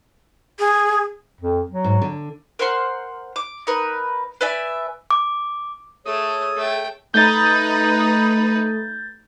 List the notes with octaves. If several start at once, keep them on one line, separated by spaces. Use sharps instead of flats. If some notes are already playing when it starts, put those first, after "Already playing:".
G#4
F2
F#3
G#2
D3
A#4 C5 F#5 C6
D6
D#4 A#4 B4
B4 D5 E5 G#5
D6
A3 G#4 A4 C#5 D#6
A3 G5
A3 D#4 B4 G6 A6